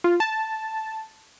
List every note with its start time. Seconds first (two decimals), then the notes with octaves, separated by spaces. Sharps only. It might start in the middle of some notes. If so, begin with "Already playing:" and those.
0.04 F4
0.20 A5